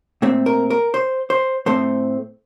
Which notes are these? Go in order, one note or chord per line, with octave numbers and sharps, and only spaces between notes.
A#2 A3 C4
A#4
A#4
C5
C5
A2 A3 C4 C5